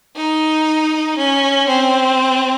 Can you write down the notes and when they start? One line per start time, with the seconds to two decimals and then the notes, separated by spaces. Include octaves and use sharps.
0.17 D#4
1.18 C#4
1.68 C4